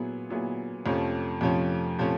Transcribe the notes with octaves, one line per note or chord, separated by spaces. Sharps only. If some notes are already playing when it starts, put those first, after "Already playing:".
Already playing: A#2 F#3 B3 E4 G#4
A#2 F#3 B3 E4 G#4
F2 C3 F3 A3 C#4
F2 C3 F3 A3 C#4
C3 F3 A3 C#4